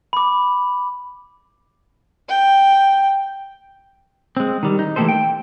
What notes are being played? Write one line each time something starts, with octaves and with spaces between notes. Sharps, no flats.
B5 D6
G5
G#3 C4
D#3 G3
D#4
E3 A3 A#3 G4 A4 C5
G5